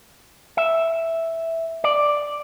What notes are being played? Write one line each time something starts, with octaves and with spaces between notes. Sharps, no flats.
E5
D5